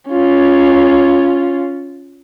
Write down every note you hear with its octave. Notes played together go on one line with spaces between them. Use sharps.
C#4 F4